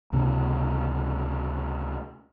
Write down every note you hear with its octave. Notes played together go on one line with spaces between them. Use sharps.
C#2 C3 A#3 D4